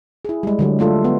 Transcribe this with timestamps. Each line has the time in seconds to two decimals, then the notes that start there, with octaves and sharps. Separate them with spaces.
0.25 E4 G#4
0.43 G3 G#3
0.59 D3 F#3 G3
0.79 G#3 A3 F4 A4
1.04 B3